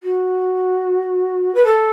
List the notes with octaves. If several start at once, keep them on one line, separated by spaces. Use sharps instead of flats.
F#4
B4
A4